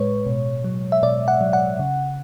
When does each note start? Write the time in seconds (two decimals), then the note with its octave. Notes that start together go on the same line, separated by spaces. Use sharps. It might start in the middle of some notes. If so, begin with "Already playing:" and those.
Already playing: A2 G#3 B4 C#5
0.26 B2
0.64 F#3
0.92 E5
1.02 B2 D5
1.28 F#5
1.41 F#3
1.53 F#5
1.79 C#3